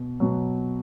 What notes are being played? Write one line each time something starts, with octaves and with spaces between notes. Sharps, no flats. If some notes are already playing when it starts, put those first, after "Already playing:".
Already playing: B2
B2 F#3